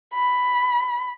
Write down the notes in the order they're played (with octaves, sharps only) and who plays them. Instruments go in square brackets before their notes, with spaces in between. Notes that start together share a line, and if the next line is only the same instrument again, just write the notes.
[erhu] B5